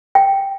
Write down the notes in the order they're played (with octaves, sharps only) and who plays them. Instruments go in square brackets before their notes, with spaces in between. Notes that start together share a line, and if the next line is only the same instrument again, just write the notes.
[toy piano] G5